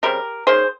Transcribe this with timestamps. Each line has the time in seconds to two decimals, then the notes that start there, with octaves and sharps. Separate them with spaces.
0.03 C#3 G3 C4 G4 A#4
0.47 D#3 A#3 C#4 G#4 C5